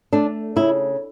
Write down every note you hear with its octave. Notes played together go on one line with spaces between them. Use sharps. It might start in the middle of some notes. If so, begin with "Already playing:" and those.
A3 D4
C#3 E4